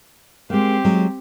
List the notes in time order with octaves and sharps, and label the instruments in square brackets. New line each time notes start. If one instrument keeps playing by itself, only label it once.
[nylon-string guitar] G#3 A#3 [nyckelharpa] C4 G4
[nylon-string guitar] F#3 G#3